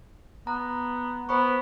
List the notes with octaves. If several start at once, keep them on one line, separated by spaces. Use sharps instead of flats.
B3 A#5
B3 C5 B5 C#6